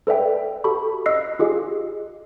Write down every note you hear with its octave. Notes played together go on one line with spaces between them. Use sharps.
A4 B4 D5 E5 G5
F#4 G4 A4 A5 B5 C#6
D#5 E6 F#6 C7
F4 G4 G#4 D#5